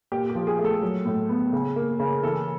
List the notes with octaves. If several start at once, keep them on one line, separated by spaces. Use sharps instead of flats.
A#2 G4
G4
F3
G#4
A3
A4
F#3
A2
B3
C#3
A#3
C#3
E3 A4